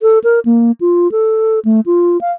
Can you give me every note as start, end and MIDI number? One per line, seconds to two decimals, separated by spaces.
0.02 0.19 69
0.24 0.40 70
0.45 0.72 58
0.81 1.11 65
1.12 1.59 69
1.65 1.81 57
1.86 2.20 65
2.21 2.32 77